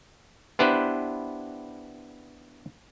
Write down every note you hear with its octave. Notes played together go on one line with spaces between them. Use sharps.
B3 D4 E4 G4 B4 C5